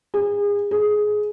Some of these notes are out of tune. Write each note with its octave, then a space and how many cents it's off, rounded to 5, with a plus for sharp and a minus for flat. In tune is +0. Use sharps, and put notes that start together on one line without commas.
G#4 -30
G#4 +15